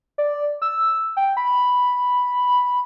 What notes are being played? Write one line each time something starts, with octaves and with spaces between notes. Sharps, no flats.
D5
E6
G5
B5